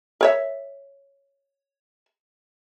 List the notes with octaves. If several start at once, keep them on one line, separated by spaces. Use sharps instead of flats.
A#4 C#5 E5